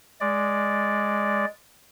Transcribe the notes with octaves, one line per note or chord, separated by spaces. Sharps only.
G#3 D5